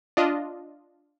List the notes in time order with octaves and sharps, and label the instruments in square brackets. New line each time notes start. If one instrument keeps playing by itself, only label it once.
[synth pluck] D4 F4 D#5